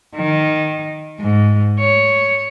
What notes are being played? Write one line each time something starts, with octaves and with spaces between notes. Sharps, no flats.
D#3
G#2
C#5